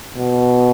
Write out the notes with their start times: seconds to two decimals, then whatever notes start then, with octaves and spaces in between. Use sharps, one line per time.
0.17 B2